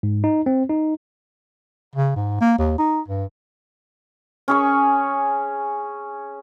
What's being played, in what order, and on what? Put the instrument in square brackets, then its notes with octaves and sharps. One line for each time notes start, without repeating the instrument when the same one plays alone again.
[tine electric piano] G#2
D#4
C4
D#4
[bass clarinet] C#3
G#2
A#3
D#2
D#4
G2
[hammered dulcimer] C#4 G#4 C#6